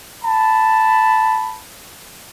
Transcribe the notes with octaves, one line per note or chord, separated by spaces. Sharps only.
A5 B5